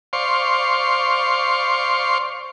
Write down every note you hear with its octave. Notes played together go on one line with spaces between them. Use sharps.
C5 D5 F5 C6 C#6